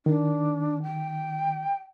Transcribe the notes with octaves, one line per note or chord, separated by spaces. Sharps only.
D#3 D4
G5